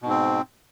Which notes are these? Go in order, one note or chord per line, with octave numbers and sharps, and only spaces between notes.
G#2 B2 C4